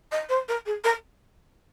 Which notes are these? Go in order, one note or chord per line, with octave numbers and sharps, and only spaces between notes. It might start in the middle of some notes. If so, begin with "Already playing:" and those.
D#5
C5
A#4
G#4
A#4